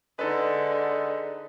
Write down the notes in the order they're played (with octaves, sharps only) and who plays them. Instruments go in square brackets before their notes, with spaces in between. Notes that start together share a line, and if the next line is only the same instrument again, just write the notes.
[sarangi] D3 [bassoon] G#3 [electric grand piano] D#4 A4 B4